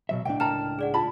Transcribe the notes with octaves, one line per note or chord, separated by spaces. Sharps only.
B2 F#3 E5
C#2 A2 D4 G5
A#4 G5 A5 A#5 F6 E7
G#4 D5 F#5
F4 A5 B5